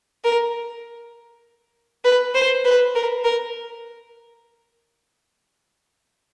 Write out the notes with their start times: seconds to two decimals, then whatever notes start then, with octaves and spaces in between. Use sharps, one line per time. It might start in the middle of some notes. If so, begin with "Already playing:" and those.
0.24 A#4
2.05 B4
2.35 C5
2.65 B4
2.95 A#4
3.24 A#4